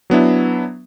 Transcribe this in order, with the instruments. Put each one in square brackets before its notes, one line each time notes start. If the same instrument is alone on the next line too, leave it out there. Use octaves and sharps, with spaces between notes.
[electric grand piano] F#3 B3 D4 E4